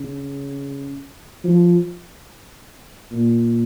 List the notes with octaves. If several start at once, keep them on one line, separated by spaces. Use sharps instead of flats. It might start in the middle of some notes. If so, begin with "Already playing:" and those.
Already playing: C#3
F3
A#2